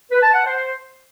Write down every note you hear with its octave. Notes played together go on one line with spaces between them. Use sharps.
B4
A5
F#5
C5